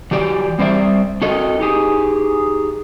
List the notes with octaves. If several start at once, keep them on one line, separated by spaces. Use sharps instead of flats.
E3 F#3 G4 D5
G3 C4 C5 D5 E5
C4 F#4 A4 A#4 D#5
D#4 G4 G#4